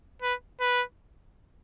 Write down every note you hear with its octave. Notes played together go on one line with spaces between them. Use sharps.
B4
B4